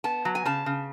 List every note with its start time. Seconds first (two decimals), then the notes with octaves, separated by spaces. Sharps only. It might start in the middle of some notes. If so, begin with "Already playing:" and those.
0.04 B3 A5
0.25 F#3
0.35 G#5
0.45 C#3 A5
0.66 C#3